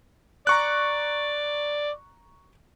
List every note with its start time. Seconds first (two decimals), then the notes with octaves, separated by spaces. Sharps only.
0.47 D5 A#5 C#6 F#6